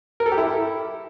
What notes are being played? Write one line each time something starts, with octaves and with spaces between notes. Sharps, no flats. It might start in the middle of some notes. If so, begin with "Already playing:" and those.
A#4
A4
G4
E4